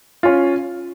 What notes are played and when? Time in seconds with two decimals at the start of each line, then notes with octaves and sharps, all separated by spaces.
0.23 C#4 F4